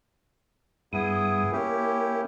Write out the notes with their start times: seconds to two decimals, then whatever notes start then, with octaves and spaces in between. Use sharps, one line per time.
0.93 G2 B3 E4 G#4 D#6
1.52 A#3 C#4 E4 G4